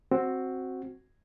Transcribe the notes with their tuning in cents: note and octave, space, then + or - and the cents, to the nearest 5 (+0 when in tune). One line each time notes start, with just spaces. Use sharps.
C4 +5 F#4 +0